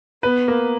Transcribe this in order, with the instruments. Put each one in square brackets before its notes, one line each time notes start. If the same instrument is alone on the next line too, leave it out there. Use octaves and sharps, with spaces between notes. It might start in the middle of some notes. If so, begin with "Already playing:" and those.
[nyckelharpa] B3 [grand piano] B4
[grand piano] A#3